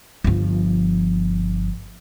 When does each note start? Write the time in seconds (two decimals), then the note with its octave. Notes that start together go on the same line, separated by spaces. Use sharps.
0.24 G1 F3